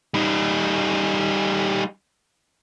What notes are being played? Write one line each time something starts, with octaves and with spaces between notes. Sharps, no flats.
G3 D#4